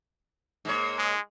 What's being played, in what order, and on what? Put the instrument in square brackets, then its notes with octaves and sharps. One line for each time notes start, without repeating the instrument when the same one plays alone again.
[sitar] G#2 A#3 C#5
[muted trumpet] G#3